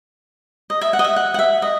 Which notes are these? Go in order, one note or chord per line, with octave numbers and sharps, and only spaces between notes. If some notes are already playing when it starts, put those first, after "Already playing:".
D#5
E5
F#5
D#5
E5
F#5
F#5
E5
D#5